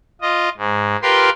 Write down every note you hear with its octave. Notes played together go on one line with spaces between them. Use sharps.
F4 D#5
G#2
F4 G4 A#4 B4 G5 C6